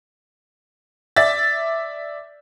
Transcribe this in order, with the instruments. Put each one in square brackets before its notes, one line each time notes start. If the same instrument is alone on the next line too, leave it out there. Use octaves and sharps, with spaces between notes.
[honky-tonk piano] D5 E5 A6